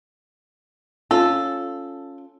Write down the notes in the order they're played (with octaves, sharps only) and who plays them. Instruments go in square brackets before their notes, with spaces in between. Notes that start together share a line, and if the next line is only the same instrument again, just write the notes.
[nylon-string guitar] C#4 F4 [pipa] A4